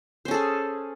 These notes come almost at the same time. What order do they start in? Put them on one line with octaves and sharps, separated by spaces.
C5 C#4 A4 G#4